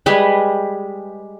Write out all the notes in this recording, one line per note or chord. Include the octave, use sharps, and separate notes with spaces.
G3 G#3 B4